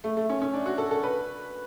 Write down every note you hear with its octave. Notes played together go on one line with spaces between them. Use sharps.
A3
A3
C#4
C#4
D4
F#4
A4
A4
B4